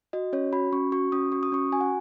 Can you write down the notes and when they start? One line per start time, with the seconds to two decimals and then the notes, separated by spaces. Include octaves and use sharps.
0.13 F#4 D#5
0.33 C#4 C#5
0.53 F#4 B5
0.72 C#4 C#6
0.92 F#4 C#6
1.12 C#4 D#6
1.32 F#4 C#6
1.43 D#6
1.52 C#4 C#6
1.72 F#4 G#5
1.81 F#5